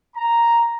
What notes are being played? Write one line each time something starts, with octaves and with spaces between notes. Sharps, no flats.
A#5